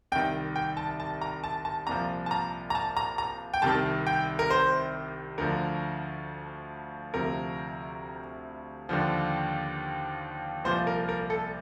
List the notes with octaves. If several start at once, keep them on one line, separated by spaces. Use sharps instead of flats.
C2 C3 D#3 G5
G5
A5
A5
A#5
A5
A5
C2 A#2 F3 A#5
A5
A#5
A#5
A5
A#5
A#5
G5
C2 C3 D#3 A5
G5
A#4
C5
D2 D3 F3 A#4
D2 C3 F3 A#4
D#2 D3 F3
C2 A#2 F3 C5
A#4
A#4
A4